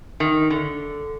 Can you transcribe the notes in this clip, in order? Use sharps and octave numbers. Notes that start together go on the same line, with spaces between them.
D#3
D3